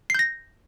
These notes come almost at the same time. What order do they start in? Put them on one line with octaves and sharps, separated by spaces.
C7 G6 A#6